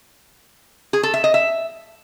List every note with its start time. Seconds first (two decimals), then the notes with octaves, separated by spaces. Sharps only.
0.93 G#4
1.03 A4
1.14 E5
1.24 D#5
1.34 E5